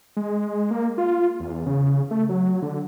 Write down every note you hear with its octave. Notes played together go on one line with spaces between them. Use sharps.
G#3
A#3
F4
E2
C#3
A3
F#3
D3